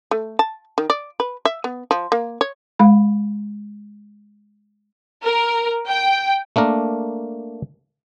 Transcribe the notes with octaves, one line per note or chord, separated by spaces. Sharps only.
A3
A5
D#3
D5
B4
E5
B3
F3
A#3
C#5
G#3 F5 B5
A#4
G5
A3 A#3 D4 A#4